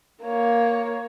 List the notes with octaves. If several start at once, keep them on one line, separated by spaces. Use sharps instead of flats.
A#3 C#5